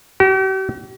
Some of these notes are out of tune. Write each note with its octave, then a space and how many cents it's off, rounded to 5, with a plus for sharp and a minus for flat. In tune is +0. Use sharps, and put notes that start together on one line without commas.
G4 -45